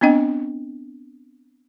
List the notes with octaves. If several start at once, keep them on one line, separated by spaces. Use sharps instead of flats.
B3 C4 D4 D#5 G5